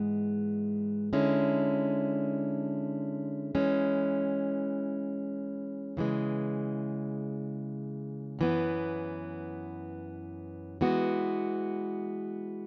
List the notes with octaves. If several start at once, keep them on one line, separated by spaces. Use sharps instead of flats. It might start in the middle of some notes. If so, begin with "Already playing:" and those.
Already playing: G#2 E3 G#3 B3
D3 G#3 C#4 E4
E3 G#3 C#4
C#3 E3 G#3
F#2 E3 B3
E3 G#3 B3 F#4